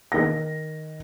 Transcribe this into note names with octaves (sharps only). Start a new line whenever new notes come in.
D#3 A#6